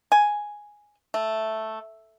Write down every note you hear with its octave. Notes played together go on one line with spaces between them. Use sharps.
G#5
A3